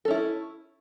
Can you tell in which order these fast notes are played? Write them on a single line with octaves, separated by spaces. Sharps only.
A4 C#4 E4